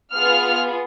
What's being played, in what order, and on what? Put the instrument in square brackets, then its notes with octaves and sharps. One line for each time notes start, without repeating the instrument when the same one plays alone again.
[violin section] B3 F4 G#4 F6